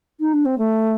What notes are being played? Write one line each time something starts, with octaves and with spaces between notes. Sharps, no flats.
D#4
D4
C4
A3